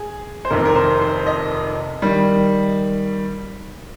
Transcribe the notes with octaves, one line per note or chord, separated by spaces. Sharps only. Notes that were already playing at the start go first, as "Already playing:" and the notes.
Already playing: G#4
C5
F1 F2 C3 D#3 A#4
A#4
C5
C5
D#5
D#3 G3